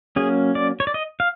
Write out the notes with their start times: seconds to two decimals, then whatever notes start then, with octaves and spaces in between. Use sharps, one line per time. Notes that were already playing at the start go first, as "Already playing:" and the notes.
0.16 F#3 A#3 C#4 G#4
0.55 D5
0.80 C#5
0.87 D5
0.94 D#5
1.20 F5